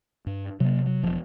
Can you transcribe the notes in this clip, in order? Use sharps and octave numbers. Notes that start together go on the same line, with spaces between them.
G2
C3 F#3 A#3
F#3
E1 C#2 F3